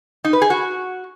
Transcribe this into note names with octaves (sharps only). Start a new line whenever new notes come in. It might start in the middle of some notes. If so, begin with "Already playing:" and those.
D#4
B4
G#4
F#4